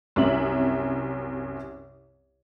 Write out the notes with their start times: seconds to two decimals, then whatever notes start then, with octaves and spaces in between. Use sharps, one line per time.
0.16 C2 F#2 C3 C#4 E5 F#7